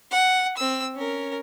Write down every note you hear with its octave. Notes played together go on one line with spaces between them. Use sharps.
F#5
C4 E6
C#4 A#4